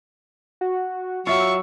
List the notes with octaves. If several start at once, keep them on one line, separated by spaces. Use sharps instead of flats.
F#4
F#3 F4 E5 C#6 E6